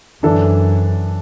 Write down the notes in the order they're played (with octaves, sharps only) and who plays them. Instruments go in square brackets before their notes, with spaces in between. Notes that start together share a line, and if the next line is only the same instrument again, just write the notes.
[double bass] F#2 [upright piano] E3 D4 A4